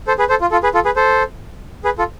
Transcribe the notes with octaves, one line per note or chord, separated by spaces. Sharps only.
A4 C5
G#4 B4
A4 C5
F4
F4 A4
G#4 B4
F4 A4
G#4 B4
A4 C5
G#4 B4
F4 A4